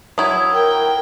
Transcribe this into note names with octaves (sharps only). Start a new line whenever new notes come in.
F#3 E4 D#6 G#6
A#4 G5